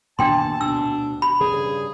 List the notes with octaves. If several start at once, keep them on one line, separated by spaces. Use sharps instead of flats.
A#2 D#3 B3 D4 G5 A5 C6
D2 B2 D4 E6
B5
G2 C#3 G#4